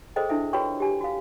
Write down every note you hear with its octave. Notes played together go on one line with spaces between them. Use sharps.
G#4 A4 C5 D#5 G5
D4 E4 A4 E5
F4 F#4 B4 C#5 G5 C#6
G4 G#5
F#4 F5